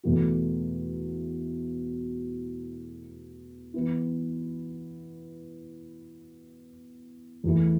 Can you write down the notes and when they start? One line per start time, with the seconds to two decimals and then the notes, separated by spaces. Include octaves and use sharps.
0.04 E2 B2 A3 F#4
3.74 E3 B3 E4
7.44 E2 E3 A3